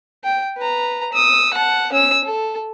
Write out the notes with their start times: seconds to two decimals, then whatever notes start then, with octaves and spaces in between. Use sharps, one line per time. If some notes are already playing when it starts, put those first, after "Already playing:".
0.24 G5
0.57 B4 A#5
1.13 D#6 E6
1.53 F#5 A5
1.93 C#4 E6
2.25 A4